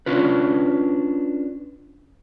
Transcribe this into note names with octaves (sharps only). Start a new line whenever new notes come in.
C#4 D4 F4 B4